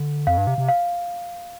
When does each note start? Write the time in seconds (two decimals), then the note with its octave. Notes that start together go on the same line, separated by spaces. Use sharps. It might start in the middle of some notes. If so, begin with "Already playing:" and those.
Already playing: D3
0.27 F2 F5
0.38 G2
0.47 C3
0.58 C3
0.68 F5